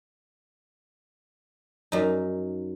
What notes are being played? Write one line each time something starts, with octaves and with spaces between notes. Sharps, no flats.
F#2 D#4